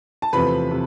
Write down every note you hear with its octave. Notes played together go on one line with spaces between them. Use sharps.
A5
E2 C3 F3 A3 C4 B4 B5
C3